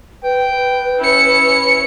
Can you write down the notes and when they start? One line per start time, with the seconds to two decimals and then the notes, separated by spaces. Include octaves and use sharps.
0.24 B4 G5
0.99 C#4 E4 C#7